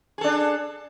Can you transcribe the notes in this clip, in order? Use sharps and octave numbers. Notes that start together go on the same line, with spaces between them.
D4 G#4 A4